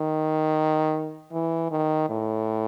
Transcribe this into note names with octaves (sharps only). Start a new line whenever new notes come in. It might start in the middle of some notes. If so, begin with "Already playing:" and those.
Already playing: D#3
E3
D#3
A2